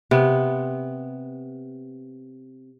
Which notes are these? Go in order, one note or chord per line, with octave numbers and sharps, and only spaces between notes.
C3 B3